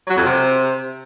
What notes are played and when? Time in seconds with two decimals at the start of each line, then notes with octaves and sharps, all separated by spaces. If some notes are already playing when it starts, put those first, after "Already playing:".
0.08 F#3
0.17 F2
0.26 C3